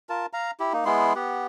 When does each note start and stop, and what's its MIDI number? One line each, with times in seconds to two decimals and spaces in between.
0.09 0.26 65
0.09 0.26 70
0.09 0.26 81
0.33 0.51 77
0.33 0.51 82
0.60 0.73 64
0.60 0.73 67
0.73 0.85 58
0.73 0.85 63
0.85 1.13 56
0.85 1.13 59
0.85 1.13 64
0.85 1.13 84
1.15 1.47 59
1.15 1.47 67
1.15 1.47 78